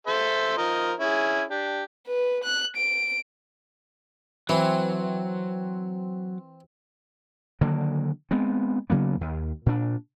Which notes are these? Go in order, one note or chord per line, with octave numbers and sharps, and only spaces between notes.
A4 C5 E5
F3 A#4 D#5
C#4 E4 G#4
D4 G4
B4
F#6
D7
E3 F#3 C4
D3 D#3 F#3 A#3
G#3 B3 C4
C#3 F#3 A#3 B3
D#2
A#2 D4